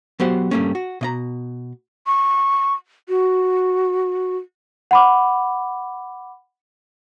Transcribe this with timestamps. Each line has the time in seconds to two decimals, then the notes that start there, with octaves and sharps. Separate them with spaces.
0.20 F#3 B3 G4 C5 F#5
0.51 G2 F#3 G3 A3 A#3 C#4
0.75 F#4
1.01 B2 D#5 A#5
2.07 C#6
3.09 F#4
4.91 F#5 B5 D6